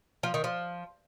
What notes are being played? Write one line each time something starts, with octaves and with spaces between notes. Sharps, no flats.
F3
D#3
F3